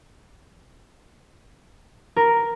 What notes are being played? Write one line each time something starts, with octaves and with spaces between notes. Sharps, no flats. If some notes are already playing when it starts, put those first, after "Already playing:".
A#4